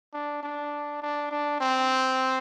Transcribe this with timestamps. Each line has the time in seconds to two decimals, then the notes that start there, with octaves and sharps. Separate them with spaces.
0.13 D4
0.43 D4
1.02 D4
1.31 D4
1.61 C4